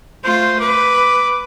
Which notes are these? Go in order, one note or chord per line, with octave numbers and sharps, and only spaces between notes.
A3 F4 C5
B4 D6